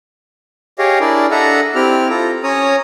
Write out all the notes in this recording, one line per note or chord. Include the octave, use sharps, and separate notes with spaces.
G4 G#4 C#5 D#5 F5
D4 E4 G#4 A#4 D5
D4 A4 D#5 E5 F#5 A#5
C4 E4 G4 F6
F4 A4 A#5
C#4 C#5 A#5 D#6